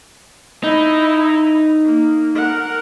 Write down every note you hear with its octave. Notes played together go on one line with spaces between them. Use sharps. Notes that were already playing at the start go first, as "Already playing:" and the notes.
D#4 E4 D#5
A#3
A#4 F#5